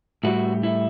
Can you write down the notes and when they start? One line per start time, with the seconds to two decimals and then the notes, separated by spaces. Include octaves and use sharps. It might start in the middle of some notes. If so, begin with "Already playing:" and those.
0.24 A2 G3 F#4
0.63 E4